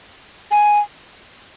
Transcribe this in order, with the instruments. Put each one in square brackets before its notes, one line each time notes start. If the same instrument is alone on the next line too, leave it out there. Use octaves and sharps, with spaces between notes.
[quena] G#5